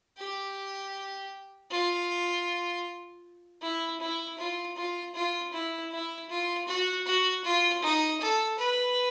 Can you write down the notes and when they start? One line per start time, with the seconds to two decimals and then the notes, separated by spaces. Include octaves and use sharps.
0.18 G4
1.71 F4
3.62 E4
4.00 E4
4.38 F4
4.77 F4
5.15 F4
5.53 E4
5.92 E4
6.29 F4
6.68 F#4
7.06 F#4
7.45 F4
7.83 D#4
8.21 A4
8.59 B4